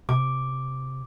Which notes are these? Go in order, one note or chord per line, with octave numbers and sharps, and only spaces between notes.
C3 D6